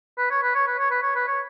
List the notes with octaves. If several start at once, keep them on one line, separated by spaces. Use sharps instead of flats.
B4
C#5
B4
C#5
B4
C#5
B4
C#5
B4
C#5